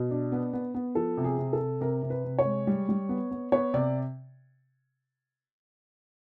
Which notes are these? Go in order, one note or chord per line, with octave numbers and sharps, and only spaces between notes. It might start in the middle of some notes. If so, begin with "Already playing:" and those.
Already playing: B2
D4
B3
B3
B3
F3 A4
C3
G#4
C3
A4
C3
C3 A#4
C3
B4
C3
C#5
G#3
G3
G3
B3
B3
B3 C#5
C3 D5